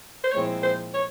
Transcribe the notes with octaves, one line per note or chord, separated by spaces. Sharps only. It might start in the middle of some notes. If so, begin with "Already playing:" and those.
C5
A#2 F3 G#3 C4 E4 C#5
C5
C#5